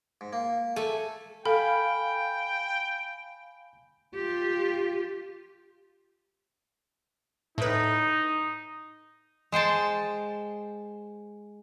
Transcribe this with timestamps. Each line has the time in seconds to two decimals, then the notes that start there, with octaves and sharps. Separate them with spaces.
0.21 G#2
0.33 A#3
0.76 A3 G#5 A5
1.46 A4 F5 G5 G#5 B5
4.14 F4 G4
7.58 A2 D#4 B4
9.52 G#3 C5 G5 A5